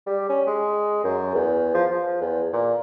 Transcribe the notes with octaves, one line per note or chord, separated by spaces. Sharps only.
G3
C#4
G#3
F#2
E2
F3
F3
E2
A#2